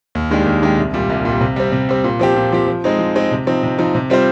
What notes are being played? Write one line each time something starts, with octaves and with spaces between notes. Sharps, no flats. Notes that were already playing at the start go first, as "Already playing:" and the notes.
D#2
D#3 G#3 D4 G4
D#2
D#3 G#3 D4 G4
C2
A#2 G3
C2
A#2 G3
C3
G3 C4
C3
G3 C4
A#2
F3 C4 G4
A#2
F3 C4 G4
F3
G#3 C4 D#4
F3
G#3 C4 D#4
C3
F3 C4 D#4
C3
F3 C4 D#4
C3
G3 C4 F4 C5